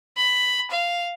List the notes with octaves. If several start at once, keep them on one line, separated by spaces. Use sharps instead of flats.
B5
F5